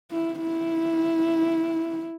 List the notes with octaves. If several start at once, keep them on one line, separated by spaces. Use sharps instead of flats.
E4
E4